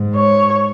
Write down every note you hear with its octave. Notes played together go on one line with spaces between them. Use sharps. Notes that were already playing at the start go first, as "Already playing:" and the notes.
Already playing: G#2
C#5